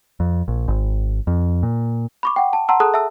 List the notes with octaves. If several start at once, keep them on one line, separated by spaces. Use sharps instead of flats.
F2
A#1
G#1
F2
A#2
B5 C#6 D6
F#5 G5
A5
F#5 A5 A#5 C6 E6
G#4 A4 A5 D#6 F#6
E5 A5 E6